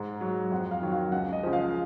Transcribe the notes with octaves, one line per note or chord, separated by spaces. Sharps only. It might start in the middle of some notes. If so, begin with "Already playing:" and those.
Already playing: G#2
F#3
F2 F#5
F5
D#3 F#3
F5
C#2 F#5
D#5
C#3 F3
F5